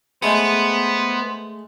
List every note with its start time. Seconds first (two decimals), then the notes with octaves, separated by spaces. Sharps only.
0.22 G#3 A3 B3 G#4 C5